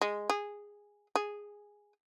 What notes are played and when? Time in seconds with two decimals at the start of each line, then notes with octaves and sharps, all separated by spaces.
0.01 G#3
0.30 G#4
1.15 G#4